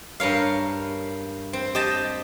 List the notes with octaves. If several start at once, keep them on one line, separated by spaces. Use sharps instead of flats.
G2 A#4 C#5 F5
C4
G4 D#5 A5